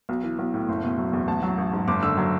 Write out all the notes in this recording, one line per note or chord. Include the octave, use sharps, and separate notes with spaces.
B1
E3
B1
A2
F#1
B2
F#3
E2
A1 A5
F#3
A1
G#2
F#1 D6
D3 E6
F#3